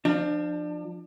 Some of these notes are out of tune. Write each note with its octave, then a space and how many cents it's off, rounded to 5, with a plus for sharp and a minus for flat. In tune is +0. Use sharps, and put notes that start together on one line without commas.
F3 +0 D4 +30